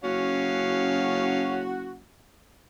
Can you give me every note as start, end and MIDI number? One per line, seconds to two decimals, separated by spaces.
0.04 2.04 30
0.04 1.62 61
0.04 1.97 66
0.04 1.62 77